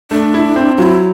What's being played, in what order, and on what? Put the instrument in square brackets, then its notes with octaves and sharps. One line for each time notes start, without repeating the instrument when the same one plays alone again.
[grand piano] A3 [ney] D4
[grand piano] E4
C4
[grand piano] F#3 [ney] E4 F4